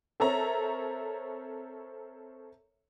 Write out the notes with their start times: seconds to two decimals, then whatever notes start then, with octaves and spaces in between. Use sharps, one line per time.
0.20 C4 A4 A#4 C#5 E5 A#5